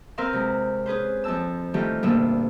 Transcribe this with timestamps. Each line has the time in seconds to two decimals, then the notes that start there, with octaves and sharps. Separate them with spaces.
0.18 C4 A#4 B4 F5 C6 E6
0.33 C3 G#3
0.86 C#4 G#4 B4 C5
1.24 F2 C4 A5 E6
1.74 D#3 E3 G3 A3 F4 G4
2.03 D2 G2 A#2 G3 B3 E6